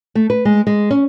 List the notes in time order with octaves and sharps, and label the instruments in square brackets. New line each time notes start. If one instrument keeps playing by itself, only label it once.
[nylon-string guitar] A3
B4
G#3
G#3
C#4